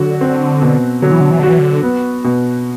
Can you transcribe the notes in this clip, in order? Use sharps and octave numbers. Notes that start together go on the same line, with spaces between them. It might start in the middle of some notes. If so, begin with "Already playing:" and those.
Already playing: D3 F#3 F#4
C4
B2
D3 F#3
E3
D3
E3
D3 F#4
E3
D3
B3
B2